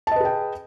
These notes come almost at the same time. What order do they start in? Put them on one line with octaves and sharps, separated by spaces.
A5 D#5 B4 G#4 G5